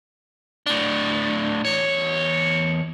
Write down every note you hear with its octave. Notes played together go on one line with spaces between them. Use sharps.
A2 D4
E2 C#5